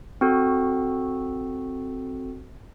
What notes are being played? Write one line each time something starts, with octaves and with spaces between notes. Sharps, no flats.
C4 F#4 A4